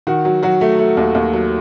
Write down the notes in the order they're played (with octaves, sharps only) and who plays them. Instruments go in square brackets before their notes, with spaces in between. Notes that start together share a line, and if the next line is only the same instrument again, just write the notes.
[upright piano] D#3 F#4
F#3
F#3 F#4
A3
A3
D#2
D#2
F#3